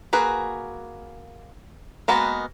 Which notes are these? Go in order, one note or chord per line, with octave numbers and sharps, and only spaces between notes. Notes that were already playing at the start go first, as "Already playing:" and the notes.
A#3 F#4 G#4 B4
G#3 A#3 B3 F#4 B4